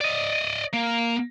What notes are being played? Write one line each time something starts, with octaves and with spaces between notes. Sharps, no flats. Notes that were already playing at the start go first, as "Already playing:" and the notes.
D5 D#5
A#3